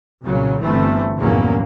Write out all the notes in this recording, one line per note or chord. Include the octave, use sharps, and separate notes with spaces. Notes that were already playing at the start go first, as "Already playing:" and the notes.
C2 A#2 C#3 F#3
G1 E3 A3 C4
A#1 E2 G2 F#3 A#3 C#4